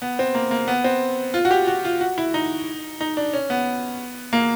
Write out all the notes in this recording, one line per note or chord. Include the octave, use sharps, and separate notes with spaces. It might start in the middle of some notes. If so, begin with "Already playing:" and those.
B3
C4
A#3
A#3
B3
C4
F4
F#4
G4
F#4
F4
F#4
E4
D#4
D#4
D4
C#4
B3
A#3